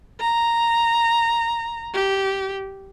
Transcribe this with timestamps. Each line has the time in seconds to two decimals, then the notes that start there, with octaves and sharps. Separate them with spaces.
0.20 A#5
1.94 G4